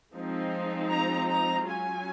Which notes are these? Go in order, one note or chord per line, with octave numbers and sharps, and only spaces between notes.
F3 G#3 C4 D#4
A#5
A#5
F#3 C#4 F4 G#5